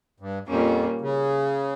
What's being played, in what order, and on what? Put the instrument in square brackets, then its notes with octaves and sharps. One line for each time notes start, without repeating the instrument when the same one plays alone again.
[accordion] G2
[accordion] F2 [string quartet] A#2 G3 A#3 C#4
[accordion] C#3